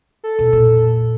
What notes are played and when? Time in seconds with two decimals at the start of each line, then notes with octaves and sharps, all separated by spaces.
0.24 A4
0.39 B2 F3
0.52 F2 A#2